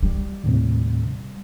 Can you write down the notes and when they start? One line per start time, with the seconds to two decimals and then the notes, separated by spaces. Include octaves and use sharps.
0.03 G3
0.44 D#2 A2 C3